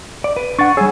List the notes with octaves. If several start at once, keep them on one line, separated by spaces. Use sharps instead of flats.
D5
B4
D4 F#5 C#6 A6
G3 G#4 C#5 G#5 E6